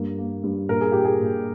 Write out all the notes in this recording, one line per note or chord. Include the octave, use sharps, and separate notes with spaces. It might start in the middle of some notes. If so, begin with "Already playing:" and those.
Already playing: G2 A#3
A#3
G2
A#2 A#4
G#4
A#2 G4
G#4
A#2